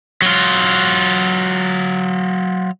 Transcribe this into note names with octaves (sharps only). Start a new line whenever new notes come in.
F#3 F4